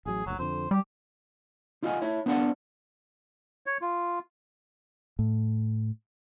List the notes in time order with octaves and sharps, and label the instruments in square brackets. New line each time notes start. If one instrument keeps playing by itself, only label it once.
[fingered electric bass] A1 F#3 [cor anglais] G#4
[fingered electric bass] F#1 D2 [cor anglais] F#3
[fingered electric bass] F2 D3 [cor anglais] C5
[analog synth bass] G3 [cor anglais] G4
[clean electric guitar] D#4 F4 D#5 E5 F#5 G#5
E4 C#5
B3 D4 C5 D5 F#5
[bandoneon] C#5
F4
[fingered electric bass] A2